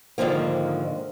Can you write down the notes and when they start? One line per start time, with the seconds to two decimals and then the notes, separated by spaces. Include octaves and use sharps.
0.18 G#2 D3 D#3 F3 A#3